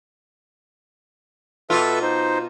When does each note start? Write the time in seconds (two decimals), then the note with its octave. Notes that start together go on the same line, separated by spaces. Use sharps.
1.70 B2 F4 A4 B4 E5
2.02 D#4 C5